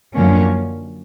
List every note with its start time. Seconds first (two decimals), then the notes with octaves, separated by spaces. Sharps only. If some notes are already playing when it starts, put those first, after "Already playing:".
0.13 F#2 D3 F3 A#3 C#4